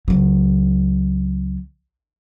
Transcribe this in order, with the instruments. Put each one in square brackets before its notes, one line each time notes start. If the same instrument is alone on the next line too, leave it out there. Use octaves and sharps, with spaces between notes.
[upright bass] C#2 F#3